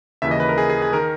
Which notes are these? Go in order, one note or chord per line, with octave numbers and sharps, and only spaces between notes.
D#2 C#3 E3 E5
D#5
B4
A#4
G#4
G#4
G#4
D#3 A#4